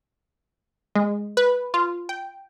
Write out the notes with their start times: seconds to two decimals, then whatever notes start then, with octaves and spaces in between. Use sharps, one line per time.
0.95 G#3
1.37 B4
1.74 F4
2.09 G5